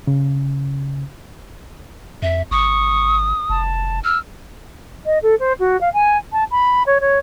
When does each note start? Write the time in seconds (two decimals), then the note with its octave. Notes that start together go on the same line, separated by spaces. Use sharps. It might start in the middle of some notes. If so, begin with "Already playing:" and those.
0.07 C#3
2.22 F2 E5
2.51 G#1 C#6 D#6
3.50 F1 A5
4.04 E6 F6
5.06 D#5
5.23 A4
5.39 C5
5.60 F#4
5.81 F5
5.94 G#5
6.32 A5
6.51 B5
6.86 C#5
7.01 C#5